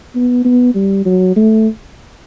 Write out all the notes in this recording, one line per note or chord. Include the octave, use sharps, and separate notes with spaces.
B3
B3
G3
F#3
A3